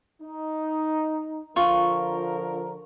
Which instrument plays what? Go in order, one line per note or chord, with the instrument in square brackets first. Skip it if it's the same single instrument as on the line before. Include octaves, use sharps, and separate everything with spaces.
[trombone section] D#4
[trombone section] D3 F3 A#4 [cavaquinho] F4 [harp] C#6